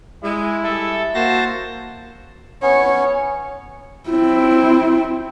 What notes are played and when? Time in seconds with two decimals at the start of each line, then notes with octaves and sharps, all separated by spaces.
0.23 G#3 E4
0.63 G3 A4 E5
1.14 A#3 F#4 C5 A5 A#6
2.62 B3 C#4 C#5
4.09 C4 E4